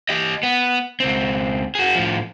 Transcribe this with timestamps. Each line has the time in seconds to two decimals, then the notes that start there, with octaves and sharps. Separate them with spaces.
0.09 G4 D#5
0.43 B3
1.00 C#2 C4
1.75 F#4 G#4
1.95 A2 F3